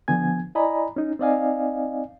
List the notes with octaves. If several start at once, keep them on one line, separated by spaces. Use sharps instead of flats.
D3 F3 B3 G#5 G#6
E4 D5 D#5 G#5 A#5 B5
C#4 D#4
C4 D#4 D5 D#5 F5 G#5